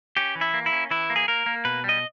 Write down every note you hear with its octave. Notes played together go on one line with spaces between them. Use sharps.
C#4 G4
E3
E4
A#3
E4
C#4
E3 E4
A#3
G#4
A#3 A#4
A#3
B2 B4
G3 D#5